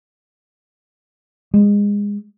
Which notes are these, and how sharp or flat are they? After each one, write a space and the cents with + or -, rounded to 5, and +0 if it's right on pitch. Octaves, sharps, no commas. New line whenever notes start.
G#3 -25